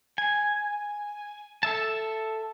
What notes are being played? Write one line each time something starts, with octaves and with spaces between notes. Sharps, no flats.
G#5
A4 E5 A5